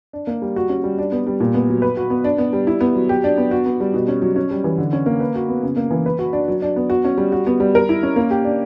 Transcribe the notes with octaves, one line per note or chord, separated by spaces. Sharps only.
D4
A#3
G3
F#4
C#4
G3
D4
B3
G3
A#2
B3
F#3
B4
F#4
B3
D4
B3
G3
E4
B3
F#3
G4
D4
B3
F#4
B3
G3
B2
C#4
F#3
C#4
G3
E3
D3
C#4
A#3
B4
F#4
B3
C#3
A#3
E3
B4
F#4
D4
F#3
D4
B3
F#4
C#4
G3
F#4
B3
G3
A#4
E4
C#4
A#3
G4
D4